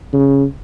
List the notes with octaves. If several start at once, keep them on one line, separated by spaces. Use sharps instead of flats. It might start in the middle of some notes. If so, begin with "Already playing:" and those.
C#3